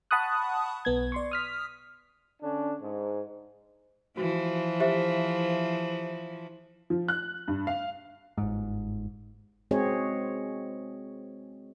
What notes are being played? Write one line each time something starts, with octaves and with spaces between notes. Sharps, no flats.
F#5 A5 B5 C#6 D#6 F#6
B1 B3 G#6
D5 C6 C#6
D#6 F6 B6
D3 C#4 D4
G#2
E3 F3 F#4
G4 C5 E5
F3
F#6
G2
F5
G1 G#2
G#3 C4 F#4 G#4 C#5 D#5